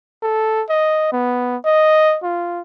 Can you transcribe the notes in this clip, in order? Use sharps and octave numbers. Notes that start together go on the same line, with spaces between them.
A4
D#5
B3
D#5
F4